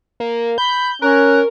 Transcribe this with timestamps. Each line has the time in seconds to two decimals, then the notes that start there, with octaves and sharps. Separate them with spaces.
0.20 A#3
0.58 B5 G6
1.02 C#4 A#4 F#6